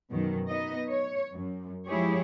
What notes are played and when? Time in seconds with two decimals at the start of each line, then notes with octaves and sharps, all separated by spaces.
0.11 F#2 B2 D#3 F#3
0.49 B3 D#4 D#5
0.89 C#5
1.33 F#2
1.87 F3 G#3 E4 G4 G#4 C#5